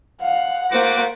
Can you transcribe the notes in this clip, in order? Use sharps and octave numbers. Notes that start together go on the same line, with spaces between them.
F5 F#5
A3 A#3 F#4 C5 D6